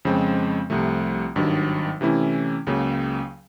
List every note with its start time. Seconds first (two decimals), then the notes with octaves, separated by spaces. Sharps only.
0.05 F2 C#3 F3 G#3 C4
0.70 C2 C3 F3 A3
1.35 G#1 G2 D#3 F#3
2.01 C3 E3 A3 C#4 E4
2.66 C#2 C#3 F#3 A#3